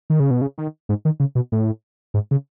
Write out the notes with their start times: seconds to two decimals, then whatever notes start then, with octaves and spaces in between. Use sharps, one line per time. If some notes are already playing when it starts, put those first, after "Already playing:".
0.10 D#3
0.20 C#3
0.31 B2
0.41 C#3
0.58 D#3
0.89 G#2
1.05 D#3
1.20 C#3
1.35 B2
1.52 A2
2.14 G#2
2.31 C#3